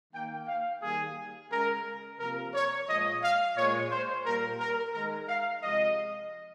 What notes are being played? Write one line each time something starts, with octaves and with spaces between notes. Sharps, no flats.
D#3 A#3 G5
F5
D#3 G3 A#3 G#4
C#3 G#3 A#4
C3 F3 A#3 A#4
C#5
A#2 F3 G#3 D#5
F5
A#2 G#3 C#5
C5
A#2 G3 A#3 A#4
A#4
D#3 G#3 A#4
F5
C3 F3 G#3 D#5